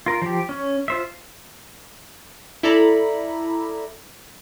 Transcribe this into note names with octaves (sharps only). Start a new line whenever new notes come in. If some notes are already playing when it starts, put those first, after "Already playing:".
F4 A#4
F3 G4
C#4
F4 C5 E5
E4 A4 D5 A#5 B5